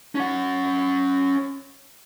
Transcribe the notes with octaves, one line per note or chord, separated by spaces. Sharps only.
C#4 F#5